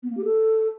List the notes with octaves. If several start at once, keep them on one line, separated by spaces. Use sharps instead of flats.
B3
A#3
G4
A4